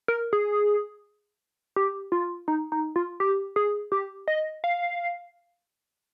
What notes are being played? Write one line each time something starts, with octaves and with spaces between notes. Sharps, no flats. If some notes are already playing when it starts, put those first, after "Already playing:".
A#4
G#4
G4
F4
D#4
D#4
F4
G4
G#4
G4
D#5
F5